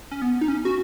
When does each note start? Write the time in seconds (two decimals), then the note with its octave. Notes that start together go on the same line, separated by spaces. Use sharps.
0.11 C#4
0.22 B3
0.41 D#4
0.48 C#4
0.65 F#4